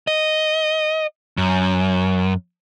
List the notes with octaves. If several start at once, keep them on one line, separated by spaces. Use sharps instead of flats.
D#5
F#2